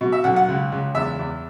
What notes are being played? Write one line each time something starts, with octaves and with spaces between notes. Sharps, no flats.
B2
E5
B1 F#5
F#5
C#2
C#2
E2 E5
E2